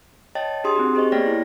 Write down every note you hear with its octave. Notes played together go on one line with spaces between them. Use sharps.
C#5 D#5 G5 A5 A6
D4 G4 G#4 C6 D#6
C4 D#4 F#4
G4 G#4 C5 D#5 C#6
A#3 B3 C#5 D5 G5 A#6
E4